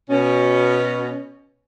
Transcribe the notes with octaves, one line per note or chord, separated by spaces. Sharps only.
B2 C#4